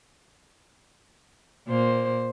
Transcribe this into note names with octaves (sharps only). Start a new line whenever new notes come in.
A#2 A#3 C5